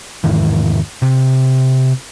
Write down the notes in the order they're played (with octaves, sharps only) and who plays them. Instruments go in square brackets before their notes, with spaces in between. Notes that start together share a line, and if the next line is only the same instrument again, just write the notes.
[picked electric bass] E2 G#2 D#3 E3
C3